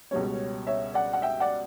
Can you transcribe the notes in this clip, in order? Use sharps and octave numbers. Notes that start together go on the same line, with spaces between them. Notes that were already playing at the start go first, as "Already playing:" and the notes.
C#2 B2 G3 C#4 C#5
C#5 E5
D5 F#5
F#5
E5 G5
D5 F#5